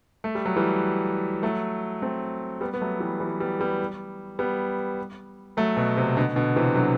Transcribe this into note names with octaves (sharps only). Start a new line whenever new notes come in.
A3
G3
F#3
E3 G3
F#3 A3
A3 C4
G3 B3
B3
F#3 A3
E3 G3
E3 G3
G3 B3
G3 B3
G3 B3
F#3 A3
B2
C3
B2 D3
B2 D3
C3 E3
D3 F#3